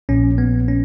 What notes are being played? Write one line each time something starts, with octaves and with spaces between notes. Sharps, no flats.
A#1 A#2 F3 C#4
B3
C#4